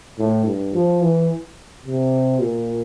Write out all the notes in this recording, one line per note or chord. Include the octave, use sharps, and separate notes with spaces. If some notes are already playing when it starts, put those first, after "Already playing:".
A2
G2
F3
E3
C3
A#2